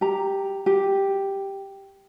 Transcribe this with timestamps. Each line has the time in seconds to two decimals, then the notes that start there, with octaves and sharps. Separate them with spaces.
0.01 G4 A#5
0.66 G4